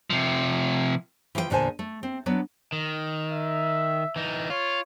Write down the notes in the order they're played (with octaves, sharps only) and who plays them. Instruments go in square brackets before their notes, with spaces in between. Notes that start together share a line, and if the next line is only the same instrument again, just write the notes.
[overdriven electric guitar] C3 F3
[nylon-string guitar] E3 F3 F4 C#5 G5
E2 A#2 D3 C5 G#5 A5
A3
C4
F#3 B3 D4
[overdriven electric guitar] D#3
[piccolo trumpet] E5
[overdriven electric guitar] E3 D#4
[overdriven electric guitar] F4 [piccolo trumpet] C#5